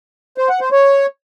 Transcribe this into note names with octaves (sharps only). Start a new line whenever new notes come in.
C5
F#5
C5
C#5